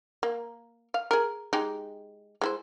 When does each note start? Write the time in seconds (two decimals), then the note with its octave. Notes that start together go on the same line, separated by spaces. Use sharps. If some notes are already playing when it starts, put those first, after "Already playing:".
0.23 A#3
0.94 F5
1.11 G#4 A#4
1.53 G#3 D#4 G4
2.41 G#3 E4 C5